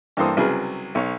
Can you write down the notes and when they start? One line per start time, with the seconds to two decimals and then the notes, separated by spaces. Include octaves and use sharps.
0.17 G2 E3 A#3 A4 C5 D#6
0.37 C2 C#3 F#3 G#4 B4 F6
0.95 B1 C#5